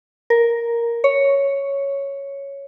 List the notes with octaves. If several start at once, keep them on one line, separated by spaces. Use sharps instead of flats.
A#4
C#5